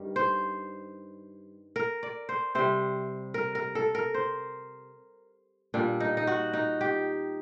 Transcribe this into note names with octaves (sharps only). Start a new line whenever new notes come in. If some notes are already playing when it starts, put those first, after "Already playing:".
Already playing: G2 D#3 G3
C5
A#4
D5
C5
C3 G3 C5
A#4
A#4
A4
A#4
C5
A#2 G3 D4
D#4
D#4
F#4
D#4
G4